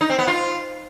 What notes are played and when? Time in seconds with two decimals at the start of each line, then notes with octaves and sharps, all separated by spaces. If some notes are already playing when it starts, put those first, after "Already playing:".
0.01 D#4
0.10 C4
0.18 B3
0.27 F4